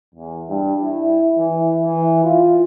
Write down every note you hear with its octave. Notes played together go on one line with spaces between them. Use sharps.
E2
G2
E4
E3
E3
F4